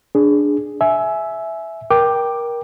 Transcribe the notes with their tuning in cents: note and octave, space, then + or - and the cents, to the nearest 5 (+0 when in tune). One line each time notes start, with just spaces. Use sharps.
D4 +0 G#4 +0
E5 +0 G#5 +20
A#4 +20 G5 +0 D6 +10